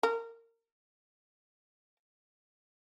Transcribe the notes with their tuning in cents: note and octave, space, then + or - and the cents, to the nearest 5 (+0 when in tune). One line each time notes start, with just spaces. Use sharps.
A#4 -25